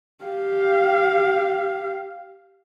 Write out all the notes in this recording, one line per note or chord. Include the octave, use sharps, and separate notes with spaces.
G4 F5